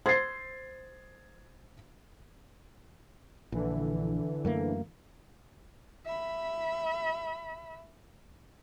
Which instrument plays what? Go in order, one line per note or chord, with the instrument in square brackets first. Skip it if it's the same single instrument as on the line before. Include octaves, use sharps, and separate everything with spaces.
[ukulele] C5 [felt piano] G#6 A6 C7
[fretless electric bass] A#1 [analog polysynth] D3 E3
[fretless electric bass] F#2 A3 A#3
[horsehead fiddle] E5 B5